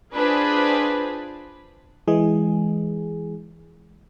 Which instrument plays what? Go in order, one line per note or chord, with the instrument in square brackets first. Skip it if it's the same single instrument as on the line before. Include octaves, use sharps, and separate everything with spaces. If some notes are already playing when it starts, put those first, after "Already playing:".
[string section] D4 F4 G#4 B4 C5
[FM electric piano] E3 G#3 G#4